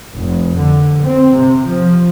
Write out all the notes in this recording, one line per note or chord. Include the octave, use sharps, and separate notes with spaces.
F1
D3
C4
C3
F3